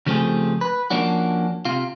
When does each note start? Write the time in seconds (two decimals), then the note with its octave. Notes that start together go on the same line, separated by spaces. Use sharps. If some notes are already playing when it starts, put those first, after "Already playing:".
0.06 C#3 F3 A3 C4 G4 G#4
0.61 B4
0.90 F3 A#3 C#4 D4 F#4
1.65 C3 F4